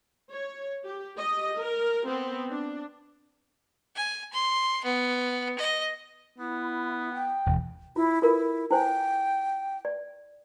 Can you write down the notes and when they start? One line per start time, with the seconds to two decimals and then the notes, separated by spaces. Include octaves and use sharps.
0.30 C#5
0.85 G4
1.16 G4 D#5
1.57 A#4
2.06 B3 C4
2.49 D4
3.96 G#5
4.32 C6
4.84 B3
5.59 D#5
6.38 B3 E4
7.14 G5
7.46 E1 D#2
7.96 E4 F4
8.22 E4 F4 A4 A#4
8.71 E4 C5 G5 G#5
9.85 D5